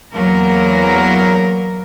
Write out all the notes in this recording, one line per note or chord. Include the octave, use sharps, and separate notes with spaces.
E2 F#3 A#3 A#4